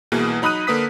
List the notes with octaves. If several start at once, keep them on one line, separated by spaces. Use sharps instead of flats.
C2 B2 E3 A#3 G#4
F#3 D#4 B5 D#6 F#6 D#7
D3 A#3 B4 D#6 B6